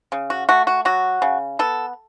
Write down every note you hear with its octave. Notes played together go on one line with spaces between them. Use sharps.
C#3
F#4
A3 F#4
F#4
F#3 F#4
C#3
B3 A4